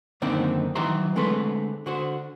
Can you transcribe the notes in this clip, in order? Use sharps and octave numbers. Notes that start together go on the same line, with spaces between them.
F#2 D3 D#3 A#3 C4 D4
D#3 E3 F#3 E5 A#5 C6
D3 G#3 A3 C4 A4 B4
D3 F#4 C5